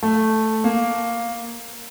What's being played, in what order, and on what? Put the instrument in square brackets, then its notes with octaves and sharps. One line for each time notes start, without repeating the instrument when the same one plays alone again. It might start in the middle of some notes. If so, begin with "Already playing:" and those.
[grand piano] A3
A#3